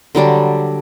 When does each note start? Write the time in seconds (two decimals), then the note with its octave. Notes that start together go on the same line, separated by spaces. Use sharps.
0.15 D3 F#3 G3 D4